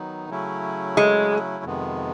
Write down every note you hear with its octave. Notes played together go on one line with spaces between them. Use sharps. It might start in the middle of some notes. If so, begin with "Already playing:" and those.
Already playing: D#3 F#3 B3 D#4
C#3 F#3 A3 C#4 E4
G#3
F2 C3 D#3 G#3 B3